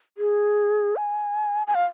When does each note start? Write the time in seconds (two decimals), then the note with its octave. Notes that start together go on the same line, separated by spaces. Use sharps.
0.18 G#4
0.96 G#5
1.67 G#5
1.75 F5